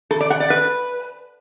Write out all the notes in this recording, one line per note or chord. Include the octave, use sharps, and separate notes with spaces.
A4
D5
F#5
D5
B4